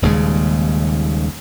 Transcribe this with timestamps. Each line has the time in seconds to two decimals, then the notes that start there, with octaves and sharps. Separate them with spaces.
0.02 D#1 D#2 C#3 G#3